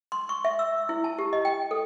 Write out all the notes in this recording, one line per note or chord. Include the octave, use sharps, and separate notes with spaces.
C6
C#6
E5
E6
E4
A5
G4
D#5
G5
A4